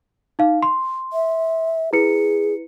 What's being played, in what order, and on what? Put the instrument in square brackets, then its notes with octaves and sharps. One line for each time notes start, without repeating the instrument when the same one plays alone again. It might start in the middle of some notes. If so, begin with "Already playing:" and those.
[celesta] D#4 F5
C6
[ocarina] E5
[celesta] E4 B4 C#7 [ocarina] G#4